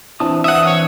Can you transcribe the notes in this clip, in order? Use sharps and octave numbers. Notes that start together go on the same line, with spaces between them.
E3 C4 D4 E4 A5 D#6
E3 E5 F#5 D#6
C#5